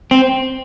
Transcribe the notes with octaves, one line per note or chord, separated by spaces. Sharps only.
C4